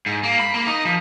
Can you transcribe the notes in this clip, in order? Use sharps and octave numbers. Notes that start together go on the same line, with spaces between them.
G#2
A#3
B5
A#3
D#4
F3